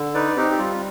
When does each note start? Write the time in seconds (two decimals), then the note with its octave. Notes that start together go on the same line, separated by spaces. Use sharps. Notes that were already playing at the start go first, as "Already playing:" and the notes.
Already playing: D3
0.14 D#4 B4 D5
0.36 C4 D#4 G4
0.51 G4
0.59 G3 F4